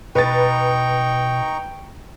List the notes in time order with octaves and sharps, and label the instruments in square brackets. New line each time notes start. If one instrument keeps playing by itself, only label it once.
[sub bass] B2 [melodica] D#4 A#5 C#6 [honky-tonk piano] B4 A6 [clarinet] G5